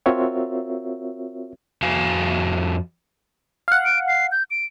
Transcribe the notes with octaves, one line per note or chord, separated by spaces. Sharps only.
C4 F4 F#4 A#4 C#5 E5
F2 F#4 F5 G#5
F5 F#5
D7
C7
G6
D7